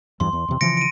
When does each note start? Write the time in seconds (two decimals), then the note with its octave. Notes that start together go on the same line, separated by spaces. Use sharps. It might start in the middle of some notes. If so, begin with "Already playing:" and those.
0.20 E2 G2 E3 C6
0.33 E2
0.48 E2 C3
0.61 C#3 E3 F3 A#6 C#7 D7
0.77 D7 D#7